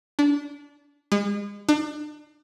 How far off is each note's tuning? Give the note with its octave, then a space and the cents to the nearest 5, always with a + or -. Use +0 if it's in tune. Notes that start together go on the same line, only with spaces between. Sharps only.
D4 -25
G#3 -35
D4 +35